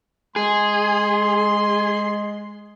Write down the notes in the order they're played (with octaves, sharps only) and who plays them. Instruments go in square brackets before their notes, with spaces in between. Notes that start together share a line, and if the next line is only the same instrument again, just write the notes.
[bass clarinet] G#3 [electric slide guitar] G#4 [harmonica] C6